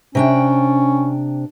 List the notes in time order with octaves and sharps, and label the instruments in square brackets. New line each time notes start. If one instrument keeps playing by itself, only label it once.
[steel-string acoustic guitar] C3 D4 G5 [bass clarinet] C#4